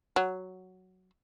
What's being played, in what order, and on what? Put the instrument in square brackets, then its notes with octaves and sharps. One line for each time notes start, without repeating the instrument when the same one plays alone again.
[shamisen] F#3